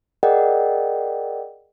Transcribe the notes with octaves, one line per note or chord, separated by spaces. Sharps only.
G#4 A#4 D5 D#5 F#5 G5